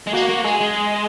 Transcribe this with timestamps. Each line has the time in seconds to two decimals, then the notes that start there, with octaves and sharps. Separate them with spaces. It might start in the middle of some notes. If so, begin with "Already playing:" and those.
0.07 G#3
0.13 A#3 F#4
0.29 A#3
0.44 G#3 G#4
0.61 G#3